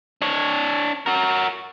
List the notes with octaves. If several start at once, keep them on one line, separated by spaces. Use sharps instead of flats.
D4 C#5
F#4 A#4